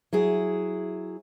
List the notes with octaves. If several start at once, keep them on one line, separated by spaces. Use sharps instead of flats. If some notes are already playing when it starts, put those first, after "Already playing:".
F#3 E4 G#4